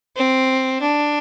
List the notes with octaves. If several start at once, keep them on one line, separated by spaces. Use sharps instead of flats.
C4
D4